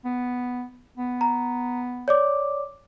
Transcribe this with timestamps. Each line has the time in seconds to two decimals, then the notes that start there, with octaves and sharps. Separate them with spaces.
0.05 B3
0.98 B3
1.21 A#5
2.08 C#5 D5 D6